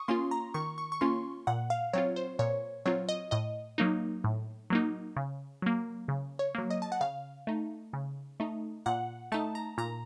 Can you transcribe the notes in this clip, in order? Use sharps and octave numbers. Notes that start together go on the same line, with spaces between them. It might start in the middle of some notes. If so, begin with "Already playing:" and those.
Already playing: C#6 D#6
A#3 C#4 F4 C6
A#5
D#3 C#6
C#6
C#6
A#3 C#4 F4 C6
A#2 F#5
F5
F#3 C4 F4 C#5
C5
A#2 C#5
F#3 C4 F4 C#5
D#5
A2 D#5
F#3 A#3 D#4
A2
F#3 A#3 D#4
C#3
F#3 A#3
C#3
C#5
F#3 A#3
D#5
A5
F#5
C#3 F5
A3 D#4
C#3
A3 D#4
A#2 F#5
A3 D#4 A5
A#5
A#2 A#5